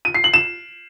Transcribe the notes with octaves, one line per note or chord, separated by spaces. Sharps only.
D#7
C7
F#7
E7